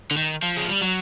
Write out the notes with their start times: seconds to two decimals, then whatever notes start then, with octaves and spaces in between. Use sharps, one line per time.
0.11 D3
0.17 D#3
0.42 F3
0.57 G#3
0.69 G3
0.81 F#3